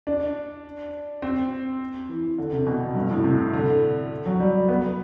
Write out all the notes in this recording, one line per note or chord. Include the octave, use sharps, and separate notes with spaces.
D4
C4
E3
D3
C3
B2
G2
A2
C3
D3
F#3
G3
B3